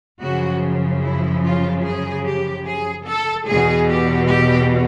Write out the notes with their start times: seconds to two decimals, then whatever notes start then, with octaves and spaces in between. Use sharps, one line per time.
0.21 F#2 C#3 F3 F#4
1.02 E4
1.43 F4
1.83 G#4
2.25 G4
2.66 G#4
3.06 A4
3.47 E2 B2 G#4
3.87 G4
4.29 G4